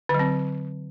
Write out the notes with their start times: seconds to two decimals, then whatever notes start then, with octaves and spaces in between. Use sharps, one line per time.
0.09 D3
0.14 F#3
0.19 C4